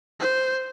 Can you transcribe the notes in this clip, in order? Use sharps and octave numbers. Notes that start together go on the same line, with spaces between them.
C5